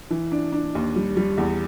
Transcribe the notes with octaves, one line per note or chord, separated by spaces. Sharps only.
E3
D4
D4
D#2
G3
G3
E2